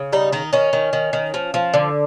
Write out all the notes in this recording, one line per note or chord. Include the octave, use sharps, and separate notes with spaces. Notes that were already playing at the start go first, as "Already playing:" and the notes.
Already playing: C#3
G3 D#4
D#3 D#4
D#3 C#4
D#3
D#3
D#3
F3
F3
D3